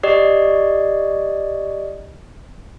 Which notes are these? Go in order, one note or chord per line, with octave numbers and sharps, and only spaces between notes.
G4 D5 D#5